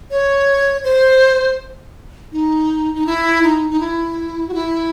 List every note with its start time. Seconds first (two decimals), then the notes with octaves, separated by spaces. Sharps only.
0.11 C#5
0.84 C5
2.32 D#4
2.94 D#4
3.06 E4
3.43 D#4
3.70 D#4
3.80 E4
4.48 F#4
4.54 E4